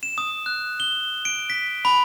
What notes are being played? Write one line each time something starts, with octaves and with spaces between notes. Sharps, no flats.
E7
D#6
F#6
G7
D7
B6
B5